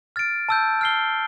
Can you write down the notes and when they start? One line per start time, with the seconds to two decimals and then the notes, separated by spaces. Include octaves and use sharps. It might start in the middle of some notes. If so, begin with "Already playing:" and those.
0.16 F6 A6 D7
0.49 A5 E6 G6
0.81 F6 C7 G7